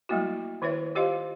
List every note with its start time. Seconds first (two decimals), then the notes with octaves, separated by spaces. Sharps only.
0.09 F#3 G3 A3 A#3 E4 F#4
0.62 D#3 E4 B4 C#5 E5
0.95 F4 G4 C5 D#5 F5 C6